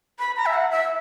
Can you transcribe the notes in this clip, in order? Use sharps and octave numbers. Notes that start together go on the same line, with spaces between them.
B5
A#5
E5
F#5
E5